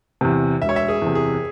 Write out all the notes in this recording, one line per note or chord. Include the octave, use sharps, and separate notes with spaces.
E2 C3
E1 E5
C#5
E5
G#4
E2
C3
G#4